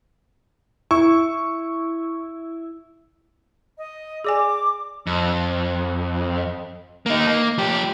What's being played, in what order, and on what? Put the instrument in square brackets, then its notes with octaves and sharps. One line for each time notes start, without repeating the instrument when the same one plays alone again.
[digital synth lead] E4 [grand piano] C#6
[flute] D#5
[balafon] G#4 D5 G#5 [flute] D6
[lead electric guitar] F2
A#3 D#4
A#3
F3 G4